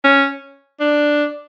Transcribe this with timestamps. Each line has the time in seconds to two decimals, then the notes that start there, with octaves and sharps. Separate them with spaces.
0.04 C#4
0.80 D4